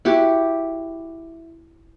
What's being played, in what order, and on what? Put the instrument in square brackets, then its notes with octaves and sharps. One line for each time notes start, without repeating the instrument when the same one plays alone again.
[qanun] E4 F#4 G4